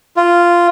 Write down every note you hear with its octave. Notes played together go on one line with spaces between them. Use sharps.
F4